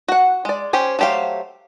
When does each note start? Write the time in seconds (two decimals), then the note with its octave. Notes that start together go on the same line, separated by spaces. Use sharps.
0.08 F#4 F#5
0.45 G#3 D5
0.73 C#4 G4 C5 G#5
0.99 F#3 A3 G4 C5 F5